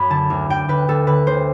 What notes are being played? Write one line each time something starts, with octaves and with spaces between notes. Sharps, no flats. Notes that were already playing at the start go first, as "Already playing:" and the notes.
Already playing: F#2 B5
D3 A5
D2
D2 G5
D2 B4
D2 A4
D3 B4
D2 C5